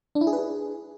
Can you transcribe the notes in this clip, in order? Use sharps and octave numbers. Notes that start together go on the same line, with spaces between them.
D4
E4
G#4
B4
G#4